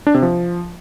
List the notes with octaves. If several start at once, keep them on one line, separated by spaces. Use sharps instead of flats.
D4
C3
F3